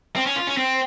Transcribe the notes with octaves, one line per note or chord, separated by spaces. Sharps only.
C4
C#4
F4
C#4
C4